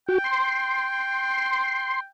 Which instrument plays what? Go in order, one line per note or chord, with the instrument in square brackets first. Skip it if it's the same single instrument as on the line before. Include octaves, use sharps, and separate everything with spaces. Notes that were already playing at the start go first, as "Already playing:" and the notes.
[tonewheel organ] F#4 [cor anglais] G5
[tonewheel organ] C6